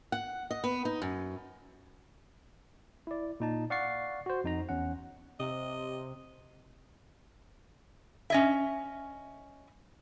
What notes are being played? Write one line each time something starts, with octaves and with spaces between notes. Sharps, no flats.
F#5
D#5
B3
D#4
F#2
E4 D5
A#2 D#4 A5
D5 F5 F#5 C#6 A6 C7
F#4 C5
F2 D#4 A#5
E2 C#4 F#5
C3 D#5
C#4 D#5 E5